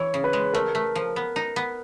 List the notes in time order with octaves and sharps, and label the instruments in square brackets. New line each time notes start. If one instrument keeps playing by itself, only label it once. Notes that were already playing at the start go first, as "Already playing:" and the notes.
Already playing: [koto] E3 [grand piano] C#5
[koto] C#3
[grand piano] B4
[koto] G#3
[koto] A3 [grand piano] A#4
[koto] A3
F3
B3
D#4
B3